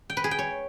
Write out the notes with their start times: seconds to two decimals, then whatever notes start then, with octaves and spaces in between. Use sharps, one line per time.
0.10 G5
0.17 B4
0.24 G#4
0.31 G5
0.39 C#5